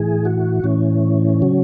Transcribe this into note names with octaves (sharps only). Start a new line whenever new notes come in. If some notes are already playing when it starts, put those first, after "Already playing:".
Already playing: A2 E3 G#4
F#4
A2 E3 C#4
C#3 F#3